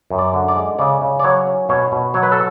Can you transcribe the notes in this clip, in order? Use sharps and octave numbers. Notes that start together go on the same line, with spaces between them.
F#2
D5
D3
D5
G#3
C#3 D5
C#3
D5
F#3 C#5
C#4
B2 C#5
B2
F#3 C#5
B4
A4